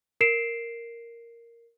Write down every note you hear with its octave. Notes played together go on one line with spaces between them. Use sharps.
A#4 C7 D7 E7